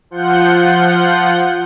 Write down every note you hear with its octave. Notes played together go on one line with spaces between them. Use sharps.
F3 F4 F#5 G6